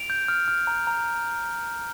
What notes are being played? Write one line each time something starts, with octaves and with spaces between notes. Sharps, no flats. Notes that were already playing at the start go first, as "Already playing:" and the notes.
Already playing: D7 F7
G6
F6
F6
A#5
A#5